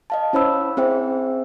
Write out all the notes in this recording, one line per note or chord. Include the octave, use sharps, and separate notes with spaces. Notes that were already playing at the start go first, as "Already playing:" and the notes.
D#5 F5 A5
C#4 E4 C5 C#5 B5 E6
C4 G#4 C5 E5 G5